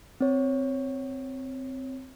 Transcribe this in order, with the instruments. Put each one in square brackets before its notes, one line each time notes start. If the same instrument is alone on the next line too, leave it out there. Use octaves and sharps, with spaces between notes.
[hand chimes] C4 C#5